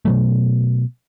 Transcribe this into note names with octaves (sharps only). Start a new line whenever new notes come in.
B2 F#3 A3